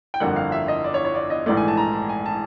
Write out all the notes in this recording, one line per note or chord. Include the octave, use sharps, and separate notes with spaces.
G5
G1 F2 D3 G3 A#3 F#5
F5
E5
D#5
D5
C#5
C#5
D5
D#5
A#1 G#2 E3 A3 D5
G#5
A5
A#5
A5
G#5
A5